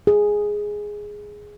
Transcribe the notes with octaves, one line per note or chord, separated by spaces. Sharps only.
G#4